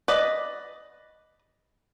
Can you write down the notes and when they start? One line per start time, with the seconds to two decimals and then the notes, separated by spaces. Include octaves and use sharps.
0.08 B4 D5 D#5